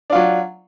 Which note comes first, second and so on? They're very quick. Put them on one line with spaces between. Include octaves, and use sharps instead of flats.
D4 F4 F#3